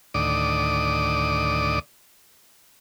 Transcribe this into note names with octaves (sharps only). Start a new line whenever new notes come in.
D2 A2 D#3 D5 D6 D#6